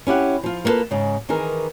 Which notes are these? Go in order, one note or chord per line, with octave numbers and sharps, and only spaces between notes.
C#4 E4 G4 F#5
F3 F4
A#3 B3 F4 A4 B4
G#2 C#3
D#3 E3 D#4 G#4 A#4